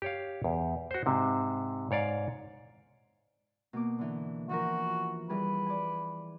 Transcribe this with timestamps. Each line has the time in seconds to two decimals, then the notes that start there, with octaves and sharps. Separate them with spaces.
0.02 G4 C#5 F5
0.44 E2
0.91 F#4 C5
1.06 G#2 C3
1.91 G#2 C#5 D5 F5
3.73 B2 A#3 D6
3.99 D3 E3
4.49 E3 F3 F#4 A#4
5.29 E3 G3 G#4 B4
5.66 D5 G#5